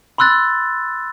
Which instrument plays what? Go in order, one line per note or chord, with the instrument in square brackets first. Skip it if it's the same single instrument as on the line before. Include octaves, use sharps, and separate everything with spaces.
[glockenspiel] B5 C6 E6 F#6 A6